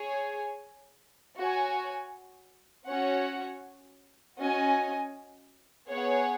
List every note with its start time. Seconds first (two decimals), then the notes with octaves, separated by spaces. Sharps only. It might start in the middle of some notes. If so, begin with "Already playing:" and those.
Already playing: G#4 C#5 G#5
1.38 F#4 C#5 G#5
2.89 C#4 F#4 C#5 F#5
4.39 C#4 F#4 D#5 G#5
5.90 B3 G#4 C#5 F#5